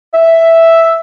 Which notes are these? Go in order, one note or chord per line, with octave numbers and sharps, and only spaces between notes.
E5